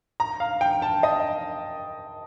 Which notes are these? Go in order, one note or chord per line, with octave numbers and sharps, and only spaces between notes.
A#5
F5
G5
A5
D#5